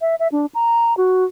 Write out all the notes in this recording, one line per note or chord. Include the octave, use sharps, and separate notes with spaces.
E5
E5
D4
A#5
F#4